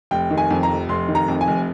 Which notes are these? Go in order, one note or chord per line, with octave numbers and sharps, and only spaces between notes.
F1 G5
D#3
G#5
F2
A#5
F1
F1 C6
D#3
A#5
F2
G#5
F1